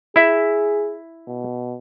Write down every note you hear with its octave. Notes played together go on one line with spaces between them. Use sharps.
E4 G#4 E5
B2